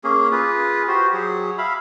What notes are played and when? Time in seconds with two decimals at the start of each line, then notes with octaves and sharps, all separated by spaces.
0.04 A#3 C#4 G#4
0.32 F4 G#4 B4
0.88 F#4 G4 C5
1.13 F#3 G#4
1.58 E5 F5 B5